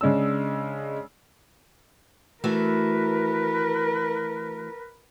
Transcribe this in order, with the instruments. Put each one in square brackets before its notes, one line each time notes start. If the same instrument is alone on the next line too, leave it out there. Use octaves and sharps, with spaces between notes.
[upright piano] C#3 G#3 D4 E6
[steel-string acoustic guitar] E3 A3 F#4 [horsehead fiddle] A#4 B4